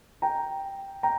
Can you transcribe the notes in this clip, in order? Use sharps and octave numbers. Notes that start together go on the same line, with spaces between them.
G5 A#5
G5 A#5